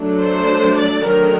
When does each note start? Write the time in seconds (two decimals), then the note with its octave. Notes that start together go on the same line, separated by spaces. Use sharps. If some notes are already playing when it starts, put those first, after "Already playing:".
Already playing: F#3 A3 D4
0.19 C5
0.76 D5
1.04 D#3 F#3 A3 D4 A#4